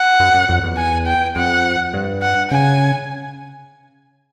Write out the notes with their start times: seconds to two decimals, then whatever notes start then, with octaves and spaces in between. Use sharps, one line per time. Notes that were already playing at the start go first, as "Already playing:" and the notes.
Already playing: F#5
0.20 F#2
0.34 F#2
0.49 F2
0.63 E2
0.77 G#5
1.07 G5
1.36 F2 F#5
1.94 G2
2.23 F#5
2.51 C#3 G#5